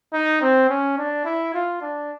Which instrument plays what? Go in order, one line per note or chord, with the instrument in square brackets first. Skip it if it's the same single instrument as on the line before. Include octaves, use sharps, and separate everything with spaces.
[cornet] D#4
C4
C#4
D4
E4
F4
D4